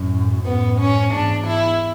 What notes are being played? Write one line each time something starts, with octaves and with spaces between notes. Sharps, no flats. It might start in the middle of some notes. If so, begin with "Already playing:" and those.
Already playing: F#2 A2
F#2 A2 B3
C#4
E2 G#2 D4
E4